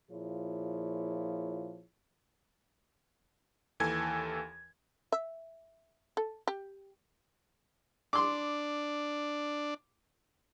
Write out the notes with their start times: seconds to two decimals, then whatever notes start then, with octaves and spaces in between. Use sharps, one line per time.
0.10 A#2 F3 E4 G#4 C#5
3.80 D#2 E3 A4 G#5 G#6
5.12 E5
6.17 A4
6.47 G4
8.13 D4 C6 D6